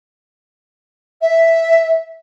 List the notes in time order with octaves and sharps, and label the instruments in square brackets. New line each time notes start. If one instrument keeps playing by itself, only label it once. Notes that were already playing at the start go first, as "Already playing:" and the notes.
[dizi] E5